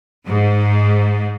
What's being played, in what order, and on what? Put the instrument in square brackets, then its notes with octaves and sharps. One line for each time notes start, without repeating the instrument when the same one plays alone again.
[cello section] G#2